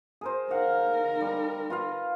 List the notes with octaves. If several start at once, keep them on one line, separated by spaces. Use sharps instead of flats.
G#4 A#4 C5
D#4 A#4 F5 F#5
G3
F4 B4 F5